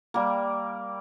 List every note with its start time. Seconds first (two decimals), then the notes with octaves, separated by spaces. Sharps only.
0.14 G3 A#3